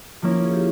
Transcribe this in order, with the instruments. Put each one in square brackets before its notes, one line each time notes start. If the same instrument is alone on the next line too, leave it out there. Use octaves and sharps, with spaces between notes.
[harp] F3 A#3 C#4 E4 [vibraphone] F4
[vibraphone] G#4
G4